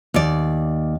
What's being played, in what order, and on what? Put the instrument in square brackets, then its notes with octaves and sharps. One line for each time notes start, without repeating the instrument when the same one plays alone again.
[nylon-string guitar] D#2 D5